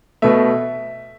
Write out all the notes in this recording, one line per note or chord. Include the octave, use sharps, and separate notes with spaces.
B2 A3 E5